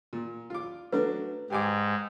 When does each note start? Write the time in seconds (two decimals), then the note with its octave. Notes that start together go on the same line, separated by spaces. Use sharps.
0.13 A#2
0.50 F4 D6
0.92 F#3 A3 D4 B4
1.50 G#2 G4 G#5 D6